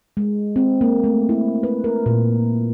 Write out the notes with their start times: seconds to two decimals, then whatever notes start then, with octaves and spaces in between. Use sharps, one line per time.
0.17 G#3
0.56 C4
0.81 A#3
1.04 A3
1.29 E4
1.63 B4
1.84 A#4
2.06 A#2